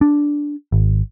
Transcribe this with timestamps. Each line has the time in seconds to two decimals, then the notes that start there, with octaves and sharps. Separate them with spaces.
0.01 D4
0.72 G#1